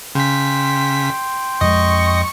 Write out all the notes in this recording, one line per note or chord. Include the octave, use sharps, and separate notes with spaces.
C#3 G5 C6 B6
F2 G#3 D#5 C#6